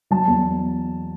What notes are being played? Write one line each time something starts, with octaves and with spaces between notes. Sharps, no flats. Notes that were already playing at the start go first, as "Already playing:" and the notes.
F#3 A5
E2